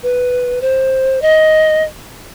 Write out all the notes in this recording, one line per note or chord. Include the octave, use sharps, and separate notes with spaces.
B4
C5
D#5